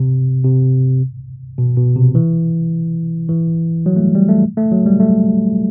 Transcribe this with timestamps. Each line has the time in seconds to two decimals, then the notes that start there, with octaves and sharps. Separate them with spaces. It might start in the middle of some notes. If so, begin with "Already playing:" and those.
Already playing: C3
0.44 C3
1.58 B2
1.77 B2
1.96 C3
2.15 E3
3.29 E3
3.86 F#3
3.96 A3
4.01 G3
4.15 G3
4.29 A3
4.57 A3
4.72 F#3
4.86 G3
5.00 A3